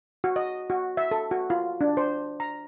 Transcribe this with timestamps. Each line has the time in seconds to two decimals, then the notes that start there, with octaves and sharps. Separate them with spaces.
0.24 F#4
0.36 D#5
0.70 F#4
0.97 E5
1.11 A4
1.31 F#4
1.50 F4
1.81 D4
1.97 C5
2.40 A#5